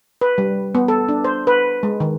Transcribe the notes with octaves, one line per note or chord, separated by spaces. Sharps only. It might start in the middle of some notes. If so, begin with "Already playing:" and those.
B4
G3
B3
A4
D4
C5
B4
G#3
D#3